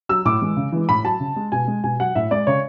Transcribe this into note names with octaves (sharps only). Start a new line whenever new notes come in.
F#3 E6
A2 D6
E3 G#3
C#3
E3 G#3
A2 B5
F#3 A5
C#3
G#3
B2 G#5
G#3
B2 G#5
F#3 F#5
A2 E5
G#3 D5
C#3 C#5